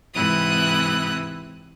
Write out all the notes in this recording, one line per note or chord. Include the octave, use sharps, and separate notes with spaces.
G#2 C3 E3 E4 D#6 F#6